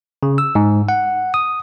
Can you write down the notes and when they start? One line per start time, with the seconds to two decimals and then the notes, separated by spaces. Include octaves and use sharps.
0.23 C#3
0.38 E6
0.55 G#2
0.89 F#5
1.34 D#6